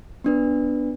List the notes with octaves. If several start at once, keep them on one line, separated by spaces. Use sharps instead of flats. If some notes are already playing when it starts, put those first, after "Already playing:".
B3 D4 B4